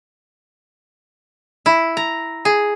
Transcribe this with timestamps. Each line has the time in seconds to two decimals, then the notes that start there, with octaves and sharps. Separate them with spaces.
1.66 E4
1.97 A#5
2.45 G#4